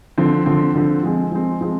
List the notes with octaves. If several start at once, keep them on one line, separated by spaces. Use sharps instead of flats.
D3 F3 C4
D3 F3 C4
D3 F3 C4
F3 G#3 C4
F3 G#3 C4
F3 G#3 C4